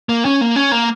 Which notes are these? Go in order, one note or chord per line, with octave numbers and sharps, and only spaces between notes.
A#3
C#4
A#3
C#4
A#3